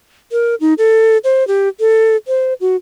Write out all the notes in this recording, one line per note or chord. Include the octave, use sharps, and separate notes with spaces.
A#4
D#4
A4
C5
G4
A4
C5
F#4